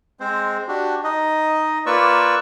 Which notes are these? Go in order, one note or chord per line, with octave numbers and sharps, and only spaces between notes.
G#3 C4 C5
D4 F#4 G4
D#4 D#5
A#3 F4 B4 D5 C#6 E6